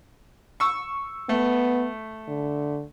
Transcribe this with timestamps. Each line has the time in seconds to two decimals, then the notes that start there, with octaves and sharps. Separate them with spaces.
0.60 C#6 E6
1.29 A3 B3
2.28 D3